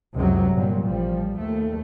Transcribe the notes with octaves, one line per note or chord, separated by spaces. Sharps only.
C#2 F#2 C3 F#3
G1 A#2 F#3 G3
A1 F3 G3
D#2 A3